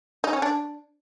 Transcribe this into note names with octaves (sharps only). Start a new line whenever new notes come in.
D#4
C#4
D4